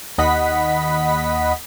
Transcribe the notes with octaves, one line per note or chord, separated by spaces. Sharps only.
D#2 D#5 F#5 B5 B6